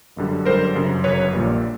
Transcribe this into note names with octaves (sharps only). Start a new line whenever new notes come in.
G1 F#2 D3 G3
G1 F#2 D3 G3 A#4 C5
G1 F#2 C#3
G1 F#2 C#3 B4 C#5
A#1 A#2 G3